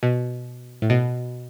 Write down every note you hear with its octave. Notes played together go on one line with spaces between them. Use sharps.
B2
A2
B2